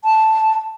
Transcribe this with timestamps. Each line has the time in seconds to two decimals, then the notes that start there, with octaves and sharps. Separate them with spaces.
0.05 A5